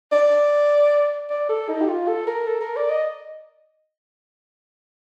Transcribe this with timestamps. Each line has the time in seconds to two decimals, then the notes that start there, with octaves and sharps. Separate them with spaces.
0.12 D5
1.30 D5
1.49 A4
1.68 D#4
1.81 G4
1.88 F4
2.08 A4
2.27 A#4
2.47 A4
2.61 A#4
2.76 D5
2.90 D#5